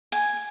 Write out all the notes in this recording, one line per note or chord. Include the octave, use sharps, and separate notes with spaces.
G#5